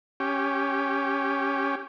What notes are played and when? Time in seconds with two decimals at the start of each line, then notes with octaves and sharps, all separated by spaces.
0.20 C#4 G4